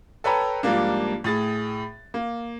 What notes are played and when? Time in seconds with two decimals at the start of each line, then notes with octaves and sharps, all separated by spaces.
0.24 A4 B4 C#5 G5 A#5
0.63 G#2 F3 G3 A#3 D4
1.24 A2 G#4 A6
2.14 A#3